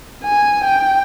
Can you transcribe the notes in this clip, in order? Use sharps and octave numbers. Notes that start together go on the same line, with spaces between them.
G#5
G5